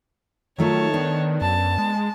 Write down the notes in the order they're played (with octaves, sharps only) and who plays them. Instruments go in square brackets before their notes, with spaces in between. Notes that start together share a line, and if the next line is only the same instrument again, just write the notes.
[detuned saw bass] D#3 [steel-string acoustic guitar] F#3 A3 F4 [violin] C#5 A5
[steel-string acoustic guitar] B3 D4
[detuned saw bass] F#2 [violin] A5
[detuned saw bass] G#3